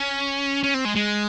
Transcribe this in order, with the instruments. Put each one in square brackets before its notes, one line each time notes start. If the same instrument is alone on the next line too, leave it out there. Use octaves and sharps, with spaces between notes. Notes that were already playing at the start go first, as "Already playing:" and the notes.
Already playing: [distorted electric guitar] C#4
C#4
C4
G#3
G#3